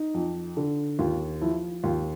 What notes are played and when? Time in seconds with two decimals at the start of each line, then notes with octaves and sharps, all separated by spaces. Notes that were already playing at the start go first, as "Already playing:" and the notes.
Already playing: D#4
0.14 F2
0.57 D3
0.99 D#2 F4
1.41 F3 E4
1.83 D#2 F4